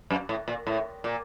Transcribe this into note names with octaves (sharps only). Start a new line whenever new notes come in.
F#2
A2
A#2
A2
A#2